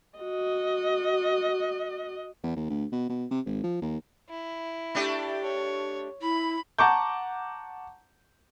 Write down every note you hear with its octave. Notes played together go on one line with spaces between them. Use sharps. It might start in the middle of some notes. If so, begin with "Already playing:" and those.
F#4 D#5
E2
D#2
D2
B2
B2
C3
G#1
F3
D#2
E4
A3 D4 G4
C#5
E4 B5
F#5 A5 A#5 C#6 D6 G6